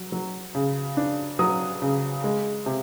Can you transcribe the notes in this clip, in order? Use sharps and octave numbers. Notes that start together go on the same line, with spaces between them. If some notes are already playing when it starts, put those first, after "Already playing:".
Already playing: F#3
F#3
C#3
D4
F#3 D#6
C#3
G#3
C3